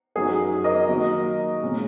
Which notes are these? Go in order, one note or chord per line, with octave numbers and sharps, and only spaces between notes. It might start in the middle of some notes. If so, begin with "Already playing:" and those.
F#2 F#3 D#4 G#4
A#4 D#5
D#3 F#3 A#3 D#4
A#2 G#3 C#4